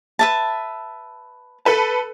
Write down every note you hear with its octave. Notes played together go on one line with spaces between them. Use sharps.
B4 E5 A5
A4 B4 A5